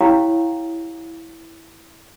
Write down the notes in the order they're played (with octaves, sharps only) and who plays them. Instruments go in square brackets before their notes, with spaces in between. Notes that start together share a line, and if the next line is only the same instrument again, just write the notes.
[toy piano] E4 G4 C#5 F5 G5 A#5